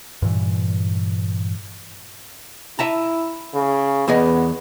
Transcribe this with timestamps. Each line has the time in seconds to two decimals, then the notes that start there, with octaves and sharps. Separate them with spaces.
0.22 G2 A#2 E3
2.79 E4 E5 A5 A#5
3.54 C#3
4.08 E2 B3 G#4 D#5